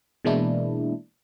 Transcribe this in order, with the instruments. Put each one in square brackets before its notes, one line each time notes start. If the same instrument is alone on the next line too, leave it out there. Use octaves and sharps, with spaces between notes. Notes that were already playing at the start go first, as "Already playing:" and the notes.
[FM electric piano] B2 E3 G#3 A#3 D4 E4